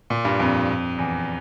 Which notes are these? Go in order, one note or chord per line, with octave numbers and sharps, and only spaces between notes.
A#2
G2
F2
E2